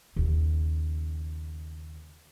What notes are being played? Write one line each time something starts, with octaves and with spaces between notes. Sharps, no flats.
D#2 C#3